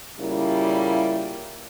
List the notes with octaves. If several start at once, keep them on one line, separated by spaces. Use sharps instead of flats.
A#2 C#3 G3 A#3 E4